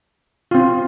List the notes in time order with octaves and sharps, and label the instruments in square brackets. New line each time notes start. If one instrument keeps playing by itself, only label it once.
[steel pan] C4 F4